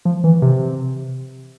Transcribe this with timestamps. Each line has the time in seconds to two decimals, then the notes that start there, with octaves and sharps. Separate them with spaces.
0.05 F3
0.24 E3
0.42 C3